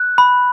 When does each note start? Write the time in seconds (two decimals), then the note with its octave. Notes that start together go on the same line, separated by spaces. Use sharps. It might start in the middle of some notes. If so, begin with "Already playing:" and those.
Already playing: F#6
0.18 B5